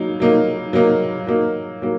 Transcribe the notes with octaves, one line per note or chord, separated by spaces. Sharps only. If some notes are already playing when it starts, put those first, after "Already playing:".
Already playing: F#3 A#3 D#4
F#3 A#3 D#4
F#3 A#3 D#4
F#3 A#3 D#4
F#3 A#3